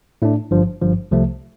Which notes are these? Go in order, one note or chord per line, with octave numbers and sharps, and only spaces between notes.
A2 A3 D4
G1 G2 F3
G1 G2 F3
C2 C3 F3 A3